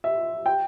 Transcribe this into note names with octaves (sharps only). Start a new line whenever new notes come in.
E5
G5